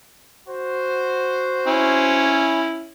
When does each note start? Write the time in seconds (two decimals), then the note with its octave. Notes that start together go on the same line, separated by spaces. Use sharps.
0.48 F#4 C5
1.67 C#4 E4